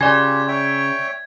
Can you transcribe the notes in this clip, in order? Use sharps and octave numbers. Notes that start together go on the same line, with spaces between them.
C#3 F4 G4 D5 G#5 G#6
C#5 E5 G5